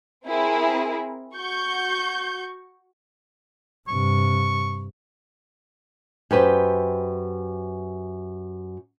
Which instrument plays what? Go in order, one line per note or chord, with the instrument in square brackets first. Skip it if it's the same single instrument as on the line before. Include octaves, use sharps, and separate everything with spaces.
[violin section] C4 E4 G#4 A#4
F#4 C#6 G6
[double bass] G2 C3 [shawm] C#6
[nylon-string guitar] F#2 G4 B4 C5